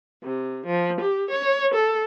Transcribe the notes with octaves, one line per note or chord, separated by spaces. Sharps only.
C3
F3
G4
C#5
A4